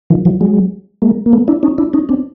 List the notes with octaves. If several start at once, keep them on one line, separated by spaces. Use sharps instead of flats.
D#3 F3
E3 F#3
F#3 G#3
G#3 A#3
A#3
A3 B3
D4 E4
C#4 D#4
D4 E4
C#4 D#4
C4 D4